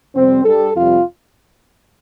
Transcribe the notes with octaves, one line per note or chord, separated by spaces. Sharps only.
F2 C3 G3 C4
G2 G3 A4
F2 C3 G3 F4